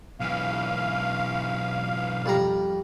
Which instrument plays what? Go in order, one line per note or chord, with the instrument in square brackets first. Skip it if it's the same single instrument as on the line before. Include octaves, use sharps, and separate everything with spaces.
[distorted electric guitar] B1 E3 [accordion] F5
[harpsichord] F2 G3 A#5